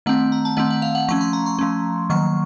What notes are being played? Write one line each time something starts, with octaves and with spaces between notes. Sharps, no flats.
D#3 A3 C4 F#5
A#5
A5
D#3 A3 C4 F#5
F#5
F5
F#5
F3 A3 C#4 C#6
C6
A#5
C6
F3 A3 C#4
D#3 F#3 A#3 C#6